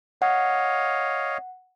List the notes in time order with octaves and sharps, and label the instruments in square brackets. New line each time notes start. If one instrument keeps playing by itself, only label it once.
[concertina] C#5 D#5 F5 [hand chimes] F#5